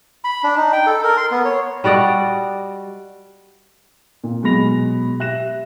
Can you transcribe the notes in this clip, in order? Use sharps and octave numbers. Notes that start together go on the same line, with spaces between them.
B5
D4
D#4
G5
A4
A#4
C6
B3
C#5
G3 F#4 D5 D#5
A#2
B2 F#3 G#3 B5 A#6 F7
G4 E5 F#6 A#6 E7